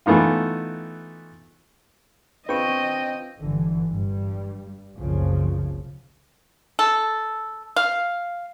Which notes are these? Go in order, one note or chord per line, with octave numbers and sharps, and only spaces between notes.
E3 A3 B3 D#4 F4
C4 D4 F4 B4 D#5 G5 C#6
G1 D3 E3
G2 G3
F#1 C2 C#3 F3
A4
F5